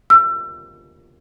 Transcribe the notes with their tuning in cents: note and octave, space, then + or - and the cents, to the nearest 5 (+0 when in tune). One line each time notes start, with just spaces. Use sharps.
E6 +35